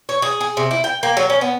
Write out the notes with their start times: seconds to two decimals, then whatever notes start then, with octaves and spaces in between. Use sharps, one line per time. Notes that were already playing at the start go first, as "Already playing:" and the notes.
0.09 C#5
0.22 G#4
0.41 G#4
0.57 C3
0.71 E4
0.84 G5
1.03 A#3
1.17 F#3
1.30 C#4
1.41 B3